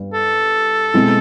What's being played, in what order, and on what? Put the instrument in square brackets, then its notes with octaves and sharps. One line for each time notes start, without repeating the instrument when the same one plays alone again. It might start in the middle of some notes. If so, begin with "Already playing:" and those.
Already playing: [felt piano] G2 G3
[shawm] A4
[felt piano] B2 G#3 C4 E4